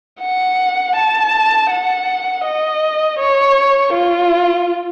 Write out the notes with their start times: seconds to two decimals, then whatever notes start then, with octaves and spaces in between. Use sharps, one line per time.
0.21 F#5
0.96 A5
1.70 F#5
2.45 D#5
3.19 C#5
3.93 F4